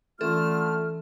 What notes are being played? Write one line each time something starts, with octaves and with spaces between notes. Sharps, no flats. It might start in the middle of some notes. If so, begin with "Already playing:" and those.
D3 E3 A3 C#4 F4 A4 F6